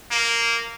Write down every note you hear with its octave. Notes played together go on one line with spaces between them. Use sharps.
A#3